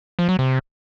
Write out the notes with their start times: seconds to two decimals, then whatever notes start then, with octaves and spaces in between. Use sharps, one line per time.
0.19 F3
0.29 F#3
0.39 C3